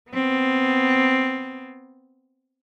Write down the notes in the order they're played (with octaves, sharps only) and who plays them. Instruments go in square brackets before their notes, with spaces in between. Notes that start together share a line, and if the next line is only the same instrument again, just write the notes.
[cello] B3 C4